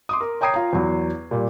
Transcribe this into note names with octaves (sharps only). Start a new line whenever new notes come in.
C6 D6 D#6
A#4
C#5 G5 A#5 D#6 G#6 C7
F4 A#5
E2 F#3
A#2 G3